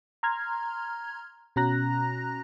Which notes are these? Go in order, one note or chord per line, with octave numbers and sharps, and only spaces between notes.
A#5 C6 F6 G#6
B2 C#4 F#4 A#5 F#6 A#6